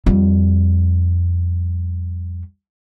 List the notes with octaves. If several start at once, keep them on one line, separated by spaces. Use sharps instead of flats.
F2 G3